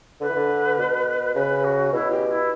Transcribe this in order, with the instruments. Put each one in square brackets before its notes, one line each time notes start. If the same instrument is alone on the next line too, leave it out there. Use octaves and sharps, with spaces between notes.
[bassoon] D3 [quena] B4
[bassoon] E3
D3
B2
[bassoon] C#3 [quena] B4
[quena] F#4
[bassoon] B2 [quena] E4
[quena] G4
E4